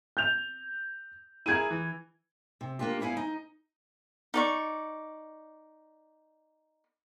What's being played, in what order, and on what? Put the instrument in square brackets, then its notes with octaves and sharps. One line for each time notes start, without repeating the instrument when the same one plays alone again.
[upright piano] G6 F7
[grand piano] E4 G#4 A#4 [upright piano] G#6 D#7
[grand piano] E3
[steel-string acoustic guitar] C3
A#3 C4 D4 F4 G4
G2 B3 E4 F5 G#5
D#4
[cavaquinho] D#4 D5 C#6